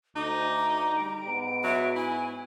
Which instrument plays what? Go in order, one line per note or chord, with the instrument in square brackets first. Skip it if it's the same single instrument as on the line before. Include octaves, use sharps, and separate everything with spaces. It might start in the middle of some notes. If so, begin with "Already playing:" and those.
[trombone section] D2 [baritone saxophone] D#4 [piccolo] D6
[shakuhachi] A#5
[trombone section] G3 [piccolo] D7
[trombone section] G#2 B3
[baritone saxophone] F#3 [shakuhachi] E5
[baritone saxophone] E4 [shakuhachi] G#5